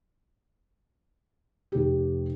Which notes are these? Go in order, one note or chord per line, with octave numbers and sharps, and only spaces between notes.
F1 G4